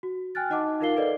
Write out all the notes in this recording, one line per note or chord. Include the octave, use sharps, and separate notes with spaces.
F#4
G5 G#5 F6 F#6 A6
D#4 D#5 F#5 A5 D6
D#4 F4 A#4 F5 C7 G7
A4 B4 D5 D#5